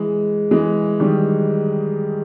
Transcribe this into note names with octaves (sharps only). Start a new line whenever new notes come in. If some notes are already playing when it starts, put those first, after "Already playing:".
Already playing: E3 G#3
E3 G#3
D#3 G3